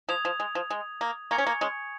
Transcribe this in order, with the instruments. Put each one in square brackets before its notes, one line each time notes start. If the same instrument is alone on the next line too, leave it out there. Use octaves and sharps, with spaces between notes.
[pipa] F3 [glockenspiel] D#6 G#6 F7
[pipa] F3
G#3
F3
G#3
A#3
[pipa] A#3 [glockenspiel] G#5 C#6 G#6 C#7 F7
[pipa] C#4
A#3
G#3 C#4